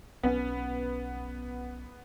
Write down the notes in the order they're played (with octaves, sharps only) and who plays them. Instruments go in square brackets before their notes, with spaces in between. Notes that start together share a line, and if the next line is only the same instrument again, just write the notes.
[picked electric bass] B1 C#4 [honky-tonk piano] B3